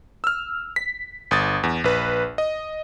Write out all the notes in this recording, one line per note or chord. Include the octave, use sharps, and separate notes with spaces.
E6 F6
B6
G1 D#6 A6
E2
A#1 B4
D#5